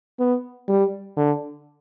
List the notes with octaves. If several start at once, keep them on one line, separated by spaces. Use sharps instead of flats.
B3
G3
D3